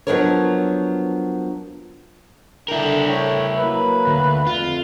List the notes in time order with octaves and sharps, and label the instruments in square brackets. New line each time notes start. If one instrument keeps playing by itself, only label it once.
[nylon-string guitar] F3 F#3 B3 D4 A#4 C#5
[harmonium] D3 D4 G5 [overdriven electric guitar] E4 A#4
[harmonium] A3 C#5 G5
[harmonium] F#3 A#3 [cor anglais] B4
[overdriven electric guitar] D2
[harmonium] F2 [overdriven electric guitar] F4